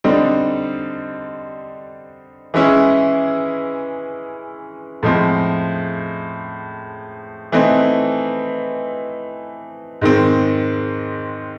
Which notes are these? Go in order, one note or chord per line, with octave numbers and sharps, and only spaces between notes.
D3 G3 C4 D#4
E3 G#3 C#4 E4 G#4
A2 F3 G#3 C4
E3 A3 C4 D#4
G#2 D#3 G#3 C4